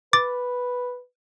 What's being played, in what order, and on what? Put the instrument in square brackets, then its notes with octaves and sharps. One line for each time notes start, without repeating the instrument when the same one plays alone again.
[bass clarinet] B4 [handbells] D6 A6